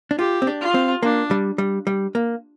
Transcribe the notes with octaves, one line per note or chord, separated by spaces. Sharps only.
D4
F4 G4
C4
D4
F4
C4
A#3 D4
G3
G3
G3
A#3